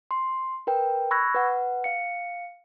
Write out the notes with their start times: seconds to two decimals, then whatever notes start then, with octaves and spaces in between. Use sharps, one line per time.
0.11 C6
0.67 A#4 B4 G5
1.11 B5 C#6 E6 F#6 G#6 A#6
1.35 B4 F#5
1.84 F5 C#7